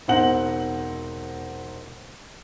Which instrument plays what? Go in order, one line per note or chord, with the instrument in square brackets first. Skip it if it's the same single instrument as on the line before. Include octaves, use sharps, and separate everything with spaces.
[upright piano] E1 C4 D#4 F#5 F#7